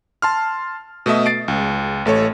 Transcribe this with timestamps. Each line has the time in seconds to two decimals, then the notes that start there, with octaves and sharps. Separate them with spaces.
0.22 A5 C6 F6
1.06 B2 A3 D#5 E5 D#6
1.26 A6 C7 D7
1.48 C#2
2.06 A1 A3 A4 C#5